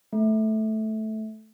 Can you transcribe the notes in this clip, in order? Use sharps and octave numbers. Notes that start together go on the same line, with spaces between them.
A3